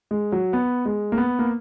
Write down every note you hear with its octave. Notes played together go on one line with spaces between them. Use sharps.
G#3
F#3
B3
G#3
A#3
B3
A#3